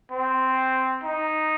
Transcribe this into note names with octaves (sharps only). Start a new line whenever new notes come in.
C4
D#4